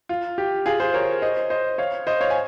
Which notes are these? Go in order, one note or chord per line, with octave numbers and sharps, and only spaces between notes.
F4
G4
F4 G#4
G#4 C5
A#4 C#5
C5 D#5
C5 D#5
C#5 F5
C5 D#5
C#5 F5
G#5